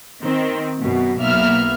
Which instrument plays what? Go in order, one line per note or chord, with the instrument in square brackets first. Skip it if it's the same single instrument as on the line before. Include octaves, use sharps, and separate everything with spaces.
[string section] D#3 C4
F#2 B2
B1 A#3 B3 E5 F6